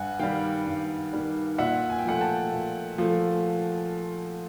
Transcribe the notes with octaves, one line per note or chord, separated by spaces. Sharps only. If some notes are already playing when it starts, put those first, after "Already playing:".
Already playing: G2 F#5 G#5
D#3 G3 F5 G5
G2
D#3 G3
A#2 E5 F#5
G#5
G5
F3 A3 F#5 G#5
G5 A5
A#2
F3 A3